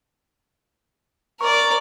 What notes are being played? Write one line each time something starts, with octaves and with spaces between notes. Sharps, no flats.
A#4 D5 C#6